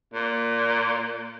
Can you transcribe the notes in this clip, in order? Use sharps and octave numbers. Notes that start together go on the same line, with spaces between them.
A#2